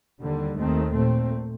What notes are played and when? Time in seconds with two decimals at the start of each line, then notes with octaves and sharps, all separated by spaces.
0.21 D#2 D3 G3
0.58 D#2 D#3 A3 C4
0.93 A#2 A3 C4